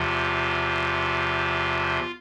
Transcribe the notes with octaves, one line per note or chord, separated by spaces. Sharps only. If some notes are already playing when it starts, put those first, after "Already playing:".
Already playing: E2 C3 F3 F4